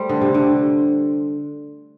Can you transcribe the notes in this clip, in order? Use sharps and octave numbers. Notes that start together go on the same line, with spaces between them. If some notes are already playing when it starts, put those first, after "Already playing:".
Already playing: G3 A3 C5
D3
C3
D3